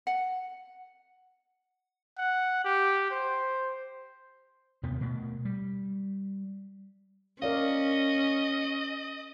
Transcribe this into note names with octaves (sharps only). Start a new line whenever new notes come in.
F#5
F#5
G4
C5
D#2 C3 D#3 B3
B2 A3
G3
C#4 A#4 D5 D#5 F5